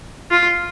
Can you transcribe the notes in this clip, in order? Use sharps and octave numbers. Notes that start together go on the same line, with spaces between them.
F4